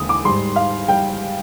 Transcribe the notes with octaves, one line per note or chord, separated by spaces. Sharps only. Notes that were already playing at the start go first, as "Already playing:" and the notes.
Already playing: D#2 D3 G#3 G#5 D#6
D6
G#2 G3 C6
F5
G3 G5